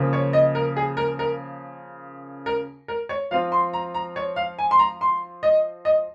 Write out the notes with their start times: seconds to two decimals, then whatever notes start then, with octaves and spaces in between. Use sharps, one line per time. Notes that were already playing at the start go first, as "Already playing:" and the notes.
Already playing: C#3 F3 A#3
0.13 C#5
0.33 D#5
0.55 A#4
0.76 G#4
0.97 A#4
1.19 A#4
2.46 A#4
2.88 A#4
3.09 C#5
3.31 F3 C4 F4 F5
3.52 C6
3.73 A#5
3.94 A#5
4.16 C#5
4.36 F5
4.59 G#5
4.71 C6
4.79 A#5
5.01 C6
5.43 D#5
5.85 D#5